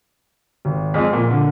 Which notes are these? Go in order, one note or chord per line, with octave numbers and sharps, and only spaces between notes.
G#1
F2 G#3
A#2
D3